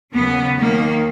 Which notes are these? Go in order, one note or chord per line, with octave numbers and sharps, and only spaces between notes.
D#2 C#3 F#3 B3
D#2 D#3 F#3 A#3